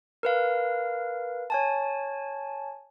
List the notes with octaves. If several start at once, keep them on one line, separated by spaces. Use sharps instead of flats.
A#4 B4 F5
C#5 G#5 A5